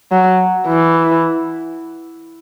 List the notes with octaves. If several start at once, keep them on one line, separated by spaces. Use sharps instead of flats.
F#3
E3